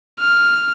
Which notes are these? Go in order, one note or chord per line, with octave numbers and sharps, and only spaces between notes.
F6